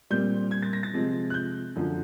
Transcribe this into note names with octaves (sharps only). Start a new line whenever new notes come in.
A#2 G3 C4 G6
G#6
A6
A#6
A6
C3 F3 G#3 C4
F#6
G6
F#2 D3 F3